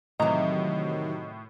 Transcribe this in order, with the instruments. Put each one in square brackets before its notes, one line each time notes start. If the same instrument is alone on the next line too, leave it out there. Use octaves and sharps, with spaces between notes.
[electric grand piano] A2 [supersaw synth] C3 D#3 F#3 [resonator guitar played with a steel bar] E3 A#5 [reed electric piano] D#5